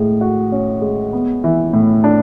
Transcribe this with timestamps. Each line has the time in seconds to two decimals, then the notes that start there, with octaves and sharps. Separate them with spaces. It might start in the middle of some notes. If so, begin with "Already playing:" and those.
Already playing: A2 G#3
0.21 F#4
0.52 C#4
0.82 G#3
1.13 B3
1.44 E3
1.73 A2
2.04 D4